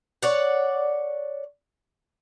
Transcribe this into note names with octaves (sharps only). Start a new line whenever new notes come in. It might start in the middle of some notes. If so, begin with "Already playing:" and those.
C#5 D5 F#5